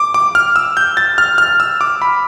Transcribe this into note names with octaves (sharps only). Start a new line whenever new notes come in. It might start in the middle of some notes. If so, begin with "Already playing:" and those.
Already playing: D6
D6
F6
E6
G6
A6
F6
F6
E6
D6
B5